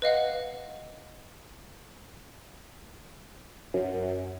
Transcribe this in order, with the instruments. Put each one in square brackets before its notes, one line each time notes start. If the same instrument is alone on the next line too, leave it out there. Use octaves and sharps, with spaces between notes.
[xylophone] B4 D#5 F5 F#5
[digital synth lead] F#2